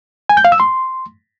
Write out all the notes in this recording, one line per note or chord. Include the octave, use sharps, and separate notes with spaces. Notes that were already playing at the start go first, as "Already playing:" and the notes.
G#5
G6
F5
E6
C6